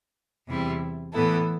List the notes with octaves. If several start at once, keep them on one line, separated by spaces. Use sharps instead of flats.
E2 C3 G3 C4 E4
A2 E3 B3 E4 A4